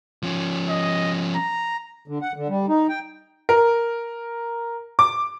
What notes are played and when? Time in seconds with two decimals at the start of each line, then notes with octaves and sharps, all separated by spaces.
0.23 F3 C#4
0.69 D#5
1.35 A#5
2.08 D3
2.22 F#5
2.36 D3
2.49 G3
2.69 D#4
2.89 G5
3.49 A#4
4.99 D6